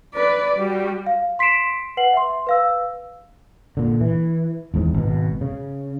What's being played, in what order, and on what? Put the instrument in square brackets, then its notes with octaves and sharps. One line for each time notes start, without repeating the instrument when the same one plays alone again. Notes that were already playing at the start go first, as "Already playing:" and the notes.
[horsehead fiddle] B4 D5
G3 F#4
[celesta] F5
C6 B6 C7 D7 E7
B4 F#5 C7 F#7
E5 C6
B4 F5 E6
[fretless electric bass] A#2 D3
E3
G#1 E2 G#2
G#1 B2
C#3